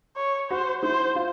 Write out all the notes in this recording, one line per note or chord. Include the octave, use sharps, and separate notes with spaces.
C#5
F#4 C5
E4 C5
F4